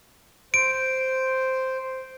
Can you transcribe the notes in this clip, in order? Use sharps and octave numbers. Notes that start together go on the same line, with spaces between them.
C5 D7